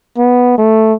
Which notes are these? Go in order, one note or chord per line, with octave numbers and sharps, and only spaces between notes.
B3
A3